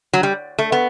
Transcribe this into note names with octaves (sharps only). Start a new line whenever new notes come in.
F#3
G3
A3
B3